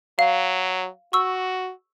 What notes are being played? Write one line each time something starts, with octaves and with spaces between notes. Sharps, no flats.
F#3 F5
F#4 C#6 E6